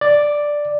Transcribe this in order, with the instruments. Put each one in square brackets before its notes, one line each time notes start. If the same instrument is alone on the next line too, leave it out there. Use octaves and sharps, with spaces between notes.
[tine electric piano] D5